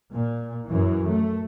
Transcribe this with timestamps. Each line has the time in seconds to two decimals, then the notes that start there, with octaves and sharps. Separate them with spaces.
0.12 A#2
0.68 F#2 E3
1.10 A3